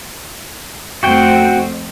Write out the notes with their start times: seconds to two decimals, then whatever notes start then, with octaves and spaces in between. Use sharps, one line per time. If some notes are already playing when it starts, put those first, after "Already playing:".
1.03 F2 A3 C4 F#4 G5